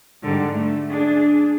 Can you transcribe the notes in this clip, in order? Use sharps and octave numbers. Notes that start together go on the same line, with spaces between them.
G#2 D3 G3
A3
D4 G#4